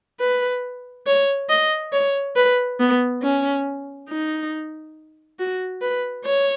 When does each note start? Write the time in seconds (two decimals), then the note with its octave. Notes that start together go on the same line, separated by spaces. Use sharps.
0.20 B4
1.07 C#5
1.49 D#5
1.93 C#5
2.36 B4
2.79 B3
3.22 C#4
4.09 D#4
5.39 F#4
5.81 B4
6.25 C#5